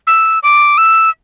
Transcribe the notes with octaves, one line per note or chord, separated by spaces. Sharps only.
E6
D6
E6